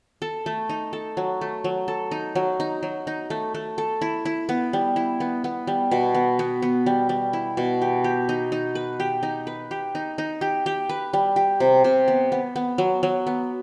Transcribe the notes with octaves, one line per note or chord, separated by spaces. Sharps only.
A4
A3
D#4
A4
F#3
A3
F#3
A4
D#4
F#3
D#4
F#3
D#4
A3
A3
A4
E4
E4
B3
G3
E4
B3
B3
G3
B2
B3
B3
B3
G3
G3
E4
B2
G4
G4
D#4
D#4
B4
G4
D#4
B4
G4
D#4
D#4
G4
G4
B4
G3
G4
C3
C3
B3
B3
B3
F#3
F#3
B3